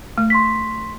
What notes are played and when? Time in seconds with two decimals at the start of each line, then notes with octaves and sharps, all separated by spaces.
0.18 A3
0.30 C6 C#6 B6